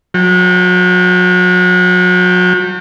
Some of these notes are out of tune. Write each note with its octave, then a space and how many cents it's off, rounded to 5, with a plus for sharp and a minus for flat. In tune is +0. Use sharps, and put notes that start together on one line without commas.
F#3 -35 G5 +0